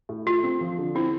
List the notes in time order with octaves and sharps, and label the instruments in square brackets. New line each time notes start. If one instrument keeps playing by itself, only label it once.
[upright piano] A2
[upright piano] A3 [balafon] F4
[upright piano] C4
F3
D3
[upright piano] C4 [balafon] E4